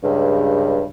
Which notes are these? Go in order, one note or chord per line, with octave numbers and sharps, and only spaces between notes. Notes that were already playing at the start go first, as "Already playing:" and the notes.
C#2 G2